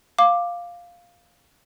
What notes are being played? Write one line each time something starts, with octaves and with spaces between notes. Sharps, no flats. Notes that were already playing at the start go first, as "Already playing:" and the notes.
F5 D6